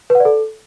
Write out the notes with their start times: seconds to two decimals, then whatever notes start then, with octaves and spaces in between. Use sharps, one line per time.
0.10 B4
0.15 F#5
0.20 D5
0.25 A4